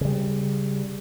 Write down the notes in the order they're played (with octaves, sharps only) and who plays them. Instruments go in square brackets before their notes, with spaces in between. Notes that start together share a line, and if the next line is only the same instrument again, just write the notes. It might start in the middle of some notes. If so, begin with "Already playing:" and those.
[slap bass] C#3 G3